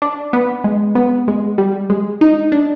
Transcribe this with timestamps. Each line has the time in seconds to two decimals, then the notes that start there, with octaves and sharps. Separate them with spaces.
0.02 D4
0.33 B3
0.64 G#3
0.95 B3
1.28 G#3
1.58 G3
1.90 G#3
2.21 D#4
2.52 D4